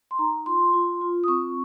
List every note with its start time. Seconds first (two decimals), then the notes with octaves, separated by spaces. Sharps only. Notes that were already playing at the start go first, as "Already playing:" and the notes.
0.11 C6
0.19 D#4 A#5
0.46 F4 C6
0.73 F4
1.01 F4
1.24 D#6
1.28 C4 C#6